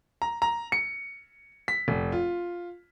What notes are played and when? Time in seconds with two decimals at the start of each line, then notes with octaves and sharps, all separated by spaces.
0.22 A#5
0.42 A#5
0.72 C#7
1.68 B6
1.88 F1
2.12 F4